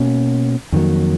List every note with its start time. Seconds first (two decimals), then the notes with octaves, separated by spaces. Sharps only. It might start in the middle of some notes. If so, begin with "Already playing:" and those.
Already playing: B2 A#3 C#4
0.72 F2 D#3 F#3 A#3